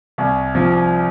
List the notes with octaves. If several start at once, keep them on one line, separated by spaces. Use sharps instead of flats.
C2
C3 F3